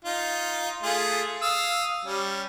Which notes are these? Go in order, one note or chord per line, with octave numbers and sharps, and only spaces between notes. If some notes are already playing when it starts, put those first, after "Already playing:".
D#4 F4
A3 F4 G#4
F5 D#6 E6
G3 C#4